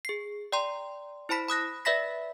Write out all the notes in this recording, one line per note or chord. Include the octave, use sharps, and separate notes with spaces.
G#4 C7
D5 G5 A#5 C6
E4 C5 A5 B5 B6
B5 D#6 F#6 A#6
B4 D5 E5 B5 A#6 B6